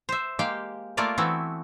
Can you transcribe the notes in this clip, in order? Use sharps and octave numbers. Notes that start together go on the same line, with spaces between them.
C5 E5
G#3 A#3 G4 F5 G5
A3 A#3 F4 A#4 D5 F5
E3 A3 B3 C4 E4 F#4